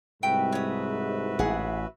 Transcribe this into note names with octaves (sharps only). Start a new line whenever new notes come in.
C2 G#2 F#4 B4 E5 G5
C#5 D#6
A1 G#4 F#5 D#6